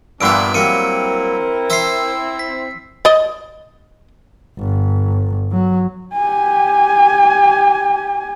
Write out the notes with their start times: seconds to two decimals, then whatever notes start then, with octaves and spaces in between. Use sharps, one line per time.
0.21 G2 A#2 B3 D4 E5 E6 D7
0.54 F#3 G3 A#3 C4 E4 A#4 C#7 D#7
1.70 E5 C6 E6 C7
2.39 B6
3.05 D5 D#5
4.59 G1
5.52 F#3
6.16 G4 G#5